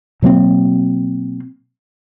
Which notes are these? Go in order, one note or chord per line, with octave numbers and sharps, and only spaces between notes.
B2 F#3 A#3 C4